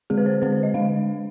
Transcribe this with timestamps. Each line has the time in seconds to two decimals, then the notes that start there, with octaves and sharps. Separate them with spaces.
0.10 D3 G#3 C4 G#4
0.18 B4
0.26 C5
0.34 B4
0.42 D3 G#3 C4 C5
0.52 C5
0.63 D#5
0.74 D3 G#3 D4 F5